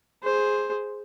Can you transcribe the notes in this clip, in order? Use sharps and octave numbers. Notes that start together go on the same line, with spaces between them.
G#4 C5